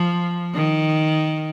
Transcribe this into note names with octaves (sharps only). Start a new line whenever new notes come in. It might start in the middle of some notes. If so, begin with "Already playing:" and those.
Already playing: F3
D#3